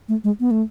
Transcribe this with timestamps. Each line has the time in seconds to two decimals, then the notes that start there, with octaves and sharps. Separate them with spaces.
0.09 A3
0.24 G#3
0.40 B3
0.51 A3